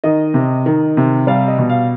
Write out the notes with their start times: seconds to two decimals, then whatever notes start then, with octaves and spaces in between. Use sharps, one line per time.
0.04 D#3 D#5
0.34 C3
0.66 D#3
0.97 C3
1.27 G3 F5
1.48 D#5
1.59 B2
1.69 F5